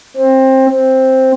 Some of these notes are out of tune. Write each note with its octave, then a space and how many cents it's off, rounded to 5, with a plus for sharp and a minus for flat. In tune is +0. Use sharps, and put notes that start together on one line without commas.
C4 +20
C4 +5